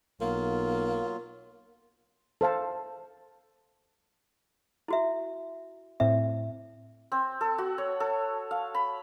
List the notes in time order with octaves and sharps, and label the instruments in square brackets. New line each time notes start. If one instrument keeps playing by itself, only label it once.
[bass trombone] B1 [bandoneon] F#3 F4 [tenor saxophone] A#3
[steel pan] A4 C5 F5 A5
[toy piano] E4 F#4 E5
[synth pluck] A2 C4 [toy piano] E5
[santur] C4
A4
F#4
C#5
A4
F5
B5